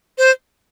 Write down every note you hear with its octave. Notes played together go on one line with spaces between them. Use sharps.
C5